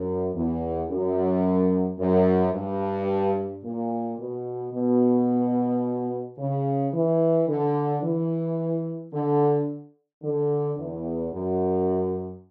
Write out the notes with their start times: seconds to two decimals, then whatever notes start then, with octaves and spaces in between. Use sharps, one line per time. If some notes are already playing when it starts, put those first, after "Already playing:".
Already playing: F#2
0.33 E2
0.89 F#2
1.98 F#2
2.53 G2
3.64 A#2
4.18 B2
4.73 B2
6.38 C#3
6.93 E3
7.48 D3
8.02 E3
9.13 D3
10.23 D3
10.78 E2
11.33 F#2